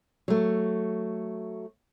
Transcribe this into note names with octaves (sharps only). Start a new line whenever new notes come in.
F#3 A3